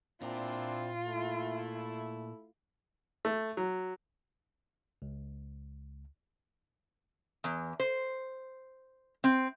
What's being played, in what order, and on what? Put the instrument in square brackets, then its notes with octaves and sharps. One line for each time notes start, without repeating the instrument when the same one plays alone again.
[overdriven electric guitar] A#2 A#4 [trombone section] C4 D4 E4 [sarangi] F4
[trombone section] A3 E4
[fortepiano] A3
F#3
[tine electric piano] C#2
[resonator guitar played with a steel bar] E2
C5
C4